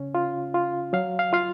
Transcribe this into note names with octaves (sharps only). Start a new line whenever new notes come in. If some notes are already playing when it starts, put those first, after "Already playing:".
Already playing: C#3 C#4
F4
F4
F#3 F5
F5
F4 F5